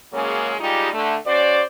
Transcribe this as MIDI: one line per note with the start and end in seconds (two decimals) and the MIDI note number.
0.13 0.54 49
0.13 0.54 54
0.13 0.54 56
0.13 0.54 58
0.13 0.54 61
0.59 0.89 55
0.59 0.89 56
0.59 0.89 63
0.59 0.89 65
0.59 0.89 67
0.92 1.15 50
0.92 1.15 57
1.27 1.62 61
1.27 1.62 66
1.27 1.62 72
1.27 1.62 74